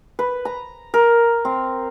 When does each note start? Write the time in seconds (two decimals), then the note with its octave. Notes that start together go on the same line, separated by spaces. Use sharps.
0.19 B4
0.45 A#5
0.94 A#4
1.45 C4